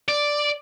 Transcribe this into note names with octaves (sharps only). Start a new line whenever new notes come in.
D5